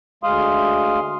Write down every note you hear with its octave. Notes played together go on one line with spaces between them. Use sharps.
D2 G#3 F5 C6 D#6